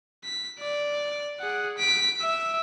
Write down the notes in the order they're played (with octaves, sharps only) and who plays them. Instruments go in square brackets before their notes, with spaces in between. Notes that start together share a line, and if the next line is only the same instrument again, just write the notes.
[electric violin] B6
D5
G#4 F#5
B6 D7
E5